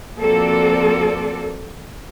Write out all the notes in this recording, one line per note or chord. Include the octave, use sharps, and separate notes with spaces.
F3 A#3 C4 F#4 A4 D5